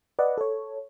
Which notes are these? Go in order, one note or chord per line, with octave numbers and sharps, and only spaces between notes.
B4 D5 D#5 F#5
A4 C#5